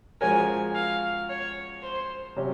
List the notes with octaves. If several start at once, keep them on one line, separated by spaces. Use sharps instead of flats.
F3 G#3 C#4 F#4 A#4 G#5
F5
C#5
C5
C3 F#3 C#4